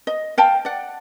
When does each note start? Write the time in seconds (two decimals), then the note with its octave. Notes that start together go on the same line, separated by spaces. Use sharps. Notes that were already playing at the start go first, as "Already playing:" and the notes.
0.07 D#5
0.38 F5 G5 A5
0.65 D5 F#5